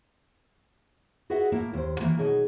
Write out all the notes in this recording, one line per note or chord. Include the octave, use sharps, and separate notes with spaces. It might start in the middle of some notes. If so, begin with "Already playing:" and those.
F#4 G#4 B4 D#5 E5 F#5
A2 A#3 E4
D#2 C5
D#3 E3 A#3
B2 F#3 D#4 G#4